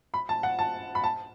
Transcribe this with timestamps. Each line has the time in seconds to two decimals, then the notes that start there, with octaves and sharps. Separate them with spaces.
0.14 B5
0.29 A5
0.43 F#5
0.59 A5
0.95 B5
1.04 A5